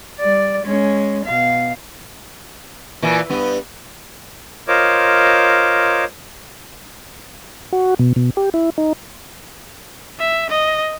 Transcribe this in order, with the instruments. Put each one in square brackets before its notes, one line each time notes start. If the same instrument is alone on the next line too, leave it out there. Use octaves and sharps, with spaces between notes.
[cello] G3 D5
G#3 C#4
B2 F5
[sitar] A#2 E3
G2 B3
[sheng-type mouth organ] F4 A#4 C5 C#5 D#5 D6
[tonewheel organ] F#4
B2
B2
G4
E4
D#4
[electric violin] E5
D#5